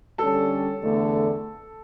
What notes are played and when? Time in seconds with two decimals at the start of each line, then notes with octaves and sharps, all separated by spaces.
0.18 D3 G3 C#4 A4 A5
0.82 E2 D3 A3